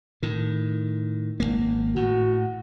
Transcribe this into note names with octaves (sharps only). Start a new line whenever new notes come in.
A2 D#3
G#1 D#2 A#3
A2 F#4